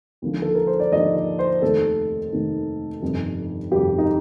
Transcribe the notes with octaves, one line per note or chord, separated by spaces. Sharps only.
D#2 D3 F3
A4
A#4
C5
D5
D#2 D3 F3 D#5
D5
C5
F1 D#2 D#3 A4
F1 D#2 D#3
G1 F2 C3 D#3
G1 F2 C3 D#3 G4
D#4